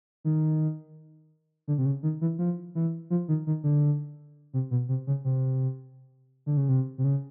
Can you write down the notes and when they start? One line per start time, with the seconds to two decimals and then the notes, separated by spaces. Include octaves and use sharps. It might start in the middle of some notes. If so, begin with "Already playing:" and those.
0.24 D#3
1.68 D3
1.78 C3
1.85 C#3
2.03 D#3
2.21 E3
2.39 F3
2.75 E3
3.10 F3
3.28 D#3
3.47 D#3
3.63 D3
4.54 C3
4.71 B2
4.89 C3
5.07 C#3
5.24 C3
6.46 D3
6.57 C#3
6.69 C3
6.98 C3
7.04 C#3